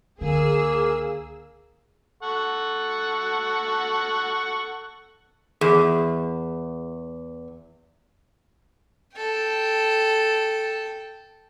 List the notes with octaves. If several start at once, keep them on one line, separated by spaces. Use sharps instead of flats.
C#2 D3 A#3 G#4 E6
A4 F#5 C#6
E2 G#4
A4 G5